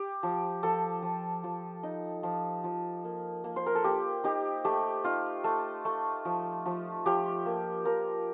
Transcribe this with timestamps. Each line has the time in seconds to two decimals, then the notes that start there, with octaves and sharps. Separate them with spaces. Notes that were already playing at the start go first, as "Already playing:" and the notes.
Already playing: G4
0.23 F3
0.63 F3 A4
1.02 F3
1.44 F3
1.83 D#4
2.23 F3
2.64 F3
3.04 A#3
3.44 A#3
3.56 C5
3.66 A#4
3.75 A4
3.84 A#3 G4
4.24 D#4 G4
4.65 A3 G4
5.04 D#4 F4
5.44 A3
5.85 A3
6.25 F3
6.66 F3
7.06 F3 G4
7.46 A#3
7.85 F3 A#4